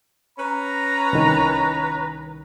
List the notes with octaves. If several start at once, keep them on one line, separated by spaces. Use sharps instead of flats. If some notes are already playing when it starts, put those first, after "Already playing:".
C#4 B4 A#5
C2 D#3